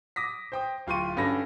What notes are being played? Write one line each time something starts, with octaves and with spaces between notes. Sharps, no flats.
D6 D#6 A#6 B6
C5 G5 D#6
D1 F4 G5 C6 C#6 D#7
G2 C#4 F#4 A4 B5 A#6